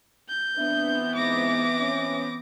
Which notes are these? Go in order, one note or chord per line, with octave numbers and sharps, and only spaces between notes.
G6
E3 B3 C4 D4 E5
G#2 D6 A#6
C#4